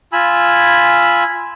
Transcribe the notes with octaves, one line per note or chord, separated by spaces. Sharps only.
F4 G#5 B5 E6